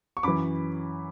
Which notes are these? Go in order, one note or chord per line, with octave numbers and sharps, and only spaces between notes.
C#6
F#2 E3 B5 D6